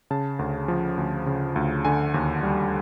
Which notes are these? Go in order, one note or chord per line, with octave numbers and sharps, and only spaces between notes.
C#3 A5
D2
F3
D2
C#3
D2
D3 G#5
D#2
G3